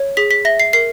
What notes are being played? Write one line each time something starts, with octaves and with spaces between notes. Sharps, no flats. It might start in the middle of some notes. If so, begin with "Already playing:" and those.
Already playing: C#5
G#4 B6
B6
E5 A#6
C7
A#4 C7